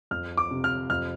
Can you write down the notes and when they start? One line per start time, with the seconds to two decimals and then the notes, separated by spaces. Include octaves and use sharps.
0.11 F2 F6
0.37 D6
0.51 C3
0.64 F6
0.90 F2 F6